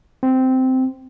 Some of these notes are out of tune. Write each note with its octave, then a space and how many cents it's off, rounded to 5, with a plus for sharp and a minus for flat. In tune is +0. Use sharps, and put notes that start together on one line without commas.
C4 -10